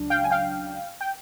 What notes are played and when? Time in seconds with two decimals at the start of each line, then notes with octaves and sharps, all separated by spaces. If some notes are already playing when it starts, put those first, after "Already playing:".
Already playing: C#2 C#3 F#3 D4
0.10 F5 G5
0.24 G#5
0.31 F5 G5
1.01 G5